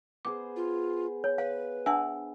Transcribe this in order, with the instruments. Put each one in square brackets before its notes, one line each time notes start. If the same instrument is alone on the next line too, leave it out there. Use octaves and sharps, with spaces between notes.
[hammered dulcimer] B3 G#4 C5 [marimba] D6
[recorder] F4
[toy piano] C#5
[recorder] B4 [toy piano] F5
[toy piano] D4 E5 G#5 [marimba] F#5 A5 E6